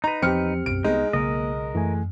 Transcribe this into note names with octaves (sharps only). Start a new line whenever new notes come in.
D#4 B4 A#5
E2 F3 C4 G4 F6 C#7
B1 F#2 D7
C2 G#3 B3 D#4
B1 C#3 A#3 A#4 D#5
F#2 E3 A3 G#5